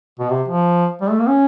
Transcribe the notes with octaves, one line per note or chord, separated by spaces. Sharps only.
B2
C3
F3
G3
A3
A#3
C#4